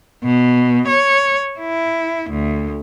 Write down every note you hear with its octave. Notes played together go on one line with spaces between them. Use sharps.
B2
C#5
E4
D2